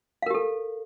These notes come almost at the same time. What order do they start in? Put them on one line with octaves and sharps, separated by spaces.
F5 A#4 G4 A4